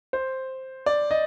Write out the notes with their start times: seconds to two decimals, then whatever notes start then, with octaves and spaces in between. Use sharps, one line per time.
0.13 C5
0.86 D5
1.11 D#5